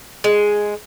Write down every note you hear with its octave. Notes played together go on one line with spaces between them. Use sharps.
G#3